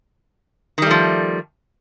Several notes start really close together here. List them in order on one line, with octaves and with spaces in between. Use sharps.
D#3 G3 A3 F3